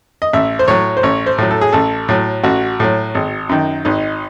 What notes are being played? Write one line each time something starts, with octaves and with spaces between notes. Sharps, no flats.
D#5
A1 E5
C5
A2 F#3 C#5
C5
A1 C#5
C5
A2 F#3
A4
G#4
A1 A4
A2 F#3
A1 F#4
A2 F#3
G#1
F#2 D#3
G#1 D#4